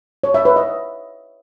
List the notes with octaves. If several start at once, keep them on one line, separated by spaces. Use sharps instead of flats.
C#5
E5
B4
D#5